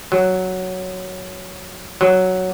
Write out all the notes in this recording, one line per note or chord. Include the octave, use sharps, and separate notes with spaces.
F#3
F#3